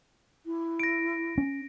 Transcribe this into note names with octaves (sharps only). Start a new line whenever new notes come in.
E4
A#6 D7
C#4